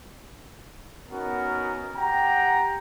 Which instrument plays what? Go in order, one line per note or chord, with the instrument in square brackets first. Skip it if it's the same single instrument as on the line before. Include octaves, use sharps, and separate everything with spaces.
[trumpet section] B3 C#4 D#4 F#4 A#4
G4 F#5 G5 A#5